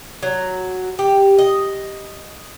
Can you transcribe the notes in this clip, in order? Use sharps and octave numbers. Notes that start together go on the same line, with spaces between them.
F#3
G4
D#5